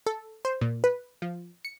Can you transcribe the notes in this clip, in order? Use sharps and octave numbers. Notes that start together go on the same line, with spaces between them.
A4
C5
A#2
B4
F3
C#7